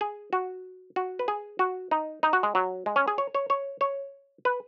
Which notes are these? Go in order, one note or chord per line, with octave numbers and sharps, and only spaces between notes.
G#4
F#4
F#4
B4
G#4
F#4
D#4
D#4
F#4
G#3
F#3
G#3
C#4
G#4
C#5
C#5
C#5
C#5
B4